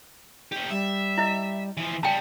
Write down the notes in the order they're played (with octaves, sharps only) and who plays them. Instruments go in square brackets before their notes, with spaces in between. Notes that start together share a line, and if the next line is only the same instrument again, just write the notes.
[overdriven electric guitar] C#4 G4
[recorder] G3 [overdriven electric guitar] E5
[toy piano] E4 D#5
[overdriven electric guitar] E3 F3
[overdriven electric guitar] C#3 G3 [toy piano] G5 A5